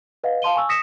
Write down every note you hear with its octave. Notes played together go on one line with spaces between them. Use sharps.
B4 D#5 F5 F#5
F5 A5 C6 D#7 G7
G#5 C#6 E6
D#6 A#6 B6 C#7 E7